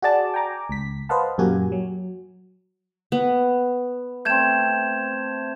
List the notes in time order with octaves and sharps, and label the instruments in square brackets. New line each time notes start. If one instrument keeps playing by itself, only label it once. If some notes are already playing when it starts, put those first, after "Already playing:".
[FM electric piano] F#4 G#4 D5 A5
G5 G#5 A#5 D6
C#2 B6
B4 C5 D#5 F5 F#5 A5
F#2 A#2 A#3 F#4 G4 G#5
F#3
[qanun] B3
[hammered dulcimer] A3 C4 [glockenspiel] G6 G#6 E7